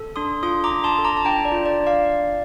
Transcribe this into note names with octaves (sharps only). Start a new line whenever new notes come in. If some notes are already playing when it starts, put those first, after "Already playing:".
Already playing: A4
D4 C6 D#6
F4 C6 D#6
A#5 D6
D4
A5 C6
A4
A#5 D6
A5
D4 G5 A#5
D5
F4
D5
D4
D5 F5